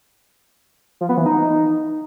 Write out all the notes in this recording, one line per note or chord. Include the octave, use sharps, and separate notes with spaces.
F3
B3
E3
D#4